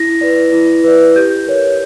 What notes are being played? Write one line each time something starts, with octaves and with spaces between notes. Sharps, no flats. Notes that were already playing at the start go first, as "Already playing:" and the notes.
Already playing: E4 A#6
B4 D5
E4
B4 D5
G4 G6
A#4 C#5